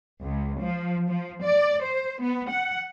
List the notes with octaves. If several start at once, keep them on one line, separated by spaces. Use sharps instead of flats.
C#2
F3
F3
D5
C5
B3
F#5